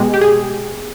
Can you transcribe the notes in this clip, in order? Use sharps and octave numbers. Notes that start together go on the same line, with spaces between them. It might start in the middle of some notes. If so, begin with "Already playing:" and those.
Already playing: B2 G#3 G4 G#4
G4
G#4